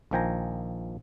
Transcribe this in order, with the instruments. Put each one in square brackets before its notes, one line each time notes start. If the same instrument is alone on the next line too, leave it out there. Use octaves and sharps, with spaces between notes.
[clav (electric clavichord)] A#1 D#3 F3 G5 G#5 A#5